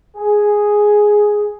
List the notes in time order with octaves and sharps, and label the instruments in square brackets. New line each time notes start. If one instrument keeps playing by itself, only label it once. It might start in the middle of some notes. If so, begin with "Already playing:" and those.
[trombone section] G#4